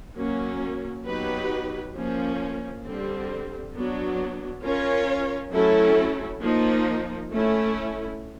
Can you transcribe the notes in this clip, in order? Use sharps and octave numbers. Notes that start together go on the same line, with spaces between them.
F#3 A#3 C#4
F#3 B3 D#4 G4 B4
F3 A#3 C#4
D3 G3 C4
F#3 B3 D4
C#4 F4 A#4 C#5
F#3 A3 C#4 E4 A4
F3 A#3 D#4
A3 C#4 E4